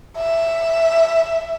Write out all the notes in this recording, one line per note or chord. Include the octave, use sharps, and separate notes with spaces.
E5